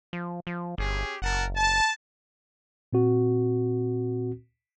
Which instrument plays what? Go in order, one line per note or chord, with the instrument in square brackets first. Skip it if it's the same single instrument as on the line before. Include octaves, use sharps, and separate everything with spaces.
[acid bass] F3
F3
[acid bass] G1 [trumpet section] C#4 G4 G#4
[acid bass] F#1 [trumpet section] A#4 F#5 A5
[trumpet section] A5
[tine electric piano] A#2 C4 F#4